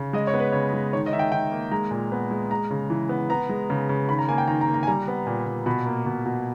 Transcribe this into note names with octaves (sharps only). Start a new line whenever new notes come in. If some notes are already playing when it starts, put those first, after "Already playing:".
Already playing: C#3
G#3 D#5
C#5
B3
B4
C#3 C#5
G#3
D#3 C#5
D#5
D#3 E5
G5
D#3 G5
A#3
G#3 A#5
A#2
B3
G#3
G#3 A#5
C#3
E3
B3
B3 A#5
G#3
C#3
C#3
D#3 B5
A#5
A#3 G#5
G5
D#3 A#5
A#5
A#3
A#5
G#5
G3 A#5
B3
A#2
A#2
B2 B5
A#3
B2
B2